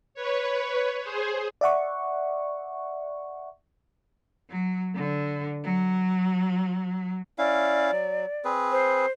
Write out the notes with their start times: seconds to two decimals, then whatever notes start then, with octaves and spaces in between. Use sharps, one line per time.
0.14 B4 C#5
1.01 G#4 C5
1.61 D5 E5 F#5 C#6
4.49 F#3
4.95 D3
5.64 F#3
7.38 C#4 E4 D5 F5
7.92 F#3
8.45 C4 G#4 B4
8.72 C5